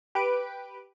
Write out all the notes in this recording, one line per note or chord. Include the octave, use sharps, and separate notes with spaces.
G4 B4 D7